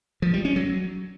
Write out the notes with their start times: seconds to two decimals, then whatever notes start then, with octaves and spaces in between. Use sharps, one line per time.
0.22 F3
0.34 G3
0.45 C#4
0.56 F#3